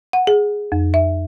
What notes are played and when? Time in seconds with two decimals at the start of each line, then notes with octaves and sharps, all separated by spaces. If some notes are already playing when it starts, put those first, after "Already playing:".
0.13 F#5
0.27 G#4
0.72 F2
0.94 E5